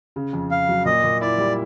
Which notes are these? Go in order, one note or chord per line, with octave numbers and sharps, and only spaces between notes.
C#3
F2
F2 F5
F#3
A#2 D#5
A#2
E4 D5
G3